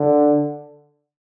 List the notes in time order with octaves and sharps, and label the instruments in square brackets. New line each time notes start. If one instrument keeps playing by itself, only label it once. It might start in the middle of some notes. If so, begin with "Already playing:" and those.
Already playing: [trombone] D3